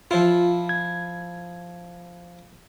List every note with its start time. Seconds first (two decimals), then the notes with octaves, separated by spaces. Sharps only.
0.11 F3 E4 F4
0.69 G#6